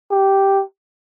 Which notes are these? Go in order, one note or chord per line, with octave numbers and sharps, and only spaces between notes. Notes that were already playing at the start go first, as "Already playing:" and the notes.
G4